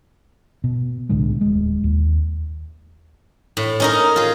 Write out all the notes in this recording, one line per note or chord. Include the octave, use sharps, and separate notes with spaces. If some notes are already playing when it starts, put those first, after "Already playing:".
B2
C2 A2 D3 G#3
D#1 G#3
D#2
A2
C#4 D#4 A#4
F4 G#4